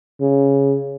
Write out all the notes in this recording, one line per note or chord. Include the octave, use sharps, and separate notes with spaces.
C#3